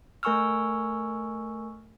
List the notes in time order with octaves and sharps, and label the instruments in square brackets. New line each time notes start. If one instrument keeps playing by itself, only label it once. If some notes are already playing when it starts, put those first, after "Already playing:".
[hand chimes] A3 A#4 G#5 C#6 E6 F6